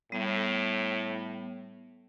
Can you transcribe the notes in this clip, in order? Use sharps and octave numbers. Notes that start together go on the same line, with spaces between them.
A2 G3 B3